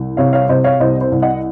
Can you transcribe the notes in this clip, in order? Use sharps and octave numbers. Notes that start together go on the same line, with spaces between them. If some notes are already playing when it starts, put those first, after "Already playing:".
Already playing: C2
C3 C#5 F5
C#5 F5
C3 C5 D#5
C#5 F5
C2 C5 D#5
C5
C2
D#5 F#5